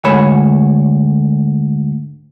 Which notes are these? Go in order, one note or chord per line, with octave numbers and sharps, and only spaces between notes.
D2 G#2 A3 C#5 B5